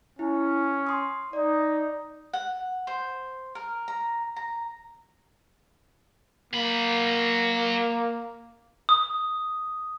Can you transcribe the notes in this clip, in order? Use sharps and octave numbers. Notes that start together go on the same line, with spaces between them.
C#4 E4
C6 D#6
D#4 D5
F#5
C5
A#4
A#5
A#5
F#3 A#3 B5
D#6